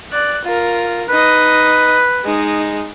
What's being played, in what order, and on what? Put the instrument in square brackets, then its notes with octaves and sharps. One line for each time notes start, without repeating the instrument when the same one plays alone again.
[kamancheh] D5 F#6
F4 A#4
[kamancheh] D#4 D#5 [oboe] B4
[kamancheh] G#3 D#4